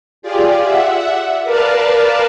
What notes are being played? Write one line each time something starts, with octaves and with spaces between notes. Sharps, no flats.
F4 G4 G#4 D5
E5 F#5
A#4 B4 D5 F5 A5